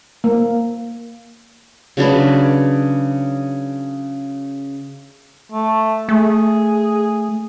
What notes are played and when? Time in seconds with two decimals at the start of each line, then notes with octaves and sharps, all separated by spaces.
0.24 A#3
1.97 C#3 F#3 D4 B4
5.52 A3
6.09 A3 G#4